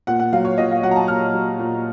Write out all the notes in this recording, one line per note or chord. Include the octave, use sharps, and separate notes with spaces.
A#2 F#5
F#5
F#3 F5
C#5
A#2 D#5
F5
F#3 F#5
A#5
A5
A#2 F6
F#3
A#2